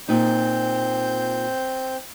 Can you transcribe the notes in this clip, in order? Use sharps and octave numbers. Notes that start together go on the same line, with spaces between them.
A#2 C4 D#4 G6